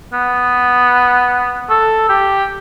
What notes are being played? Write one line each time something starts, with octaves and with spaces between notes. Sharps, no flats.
B3
A4
G4